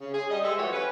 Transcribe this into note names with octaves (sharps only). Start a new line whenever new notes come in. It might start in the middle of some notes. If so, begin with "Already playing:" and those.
C#3
G#4
G3 D#5
G#3 G#4 A4 C5 E5
E3 F3 A3 F#4 G4 C#5
C#4 B4